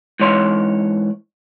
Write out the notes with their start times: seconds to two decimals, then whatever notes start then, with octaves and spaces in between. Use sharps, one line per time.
0.20 G#2 E3 C#5 C6